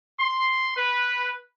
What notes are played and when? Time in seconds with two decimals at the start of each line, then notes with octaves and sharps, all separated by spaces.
0.20 C6
0.77 B4